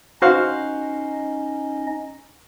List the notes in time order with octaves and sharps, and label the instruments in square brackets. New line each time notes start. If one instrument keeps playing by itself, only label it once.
[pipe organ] C#4 D#4 D#5 [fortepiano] F#4 C5 F5